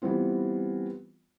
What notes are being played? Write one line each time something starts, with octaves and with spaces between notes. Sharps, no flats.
E3 G3 B3 C4 F4